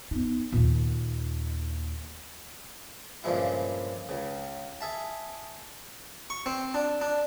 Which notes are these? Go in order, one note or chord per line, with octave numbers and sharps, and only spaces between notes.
B3 D#4
D#2 A#2
G2 A#2 C#3 F3 G#3 E4
C#2 C#3
G#4 E5 A5
C#6
C4
D4
D4